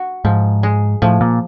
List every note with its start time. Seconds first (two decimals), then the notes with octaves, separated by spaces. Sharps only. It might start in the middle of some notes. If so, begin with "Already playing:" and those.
Already playing: F#4
0.25 G#2 F3
0.63 G#3
1.02 A2 F3
1.21 A#2